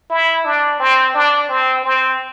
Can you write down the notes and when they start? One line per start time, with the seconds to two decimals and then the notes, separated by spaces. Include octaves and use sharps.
0.10 E4
0.45 D4
0.80 C4
1.14 D4
1.49 C4
1.84 C4